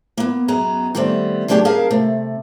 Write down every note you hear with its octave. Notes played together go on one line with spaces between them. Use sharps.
A#3 B3
F#2 B2 B3 G#4 D#5 A#5
D#3 G3 A3 B3 C4
D3 F#3 A3 D4 G4 G#4
A#3 C#4 G#4 A#4 F5 A5
C3 A3